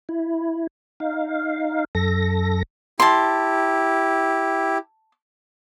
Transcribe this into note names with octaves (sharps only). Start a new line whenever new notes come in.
E4
D#4 F5
F#2 A4 A#6
E4 G4 A5 C6